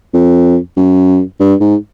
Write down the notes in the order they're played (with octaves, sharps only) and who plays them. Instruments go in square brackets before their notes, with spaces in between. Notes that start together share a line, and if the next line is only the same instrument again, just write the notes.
[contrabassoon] F2
F#2
G2
G#2